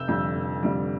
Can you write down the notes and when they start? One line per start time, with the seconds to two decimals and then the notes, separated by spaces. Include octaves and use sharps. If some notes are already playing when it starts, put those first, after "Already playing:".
Already playing: F1 E6 G6
0.08 F2 D3 G3
0.36 F1
0.63 F2 D3 G3